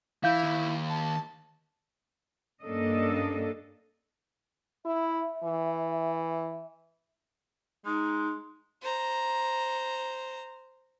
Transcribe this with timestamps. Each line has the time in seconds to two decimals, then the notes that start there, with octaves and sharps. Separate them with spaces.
0.24 E3 E4 F5 G6
0.43 D#2
0.90 A5
2.60 G2 A#3 C#4 D4 A4 D#5
4.86 E4 E5
5.44 E3
7.86 G#3 D#4
8.82 C5 A#5